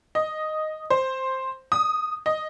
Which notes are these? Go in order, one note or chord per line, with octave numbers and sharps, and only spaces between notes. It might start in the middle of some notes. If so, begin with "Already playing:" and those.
D#5
C5
D#6
D#5